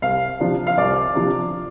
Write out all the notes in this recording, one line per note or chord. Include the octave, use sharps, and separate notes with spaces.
C2 F5
C3 F3 D4
F5
C2 D5
C3 F3 D4